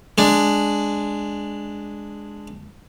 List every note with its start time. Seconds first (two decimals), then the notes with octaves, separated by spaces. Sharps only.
0.18 G#3 D4